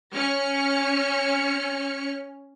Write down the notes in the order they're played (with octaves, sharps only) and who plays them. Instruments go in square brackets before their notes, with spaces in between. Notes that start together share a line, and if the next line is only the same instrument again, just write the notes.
[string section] C#4 F6 C#7